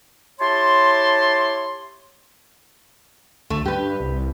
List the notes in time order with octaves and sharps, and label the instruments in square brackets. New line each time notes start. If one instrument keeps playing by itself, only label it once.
[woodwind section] E4 G4 C#5 A5 C6
[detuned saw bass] D2 [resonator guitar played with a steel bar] A3
[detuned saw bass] G2 [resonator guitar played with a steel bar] G4 B4
[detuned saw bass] C2